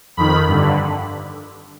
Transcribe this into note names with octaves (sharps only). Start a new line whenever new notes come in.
F2 D#3 B5
G2 D3